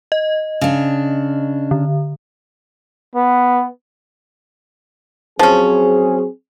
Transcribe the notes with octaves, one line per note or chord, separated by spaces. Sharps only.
D#5
C#3 D4
D3
B3
F3 F#3 C4 C#4 G#4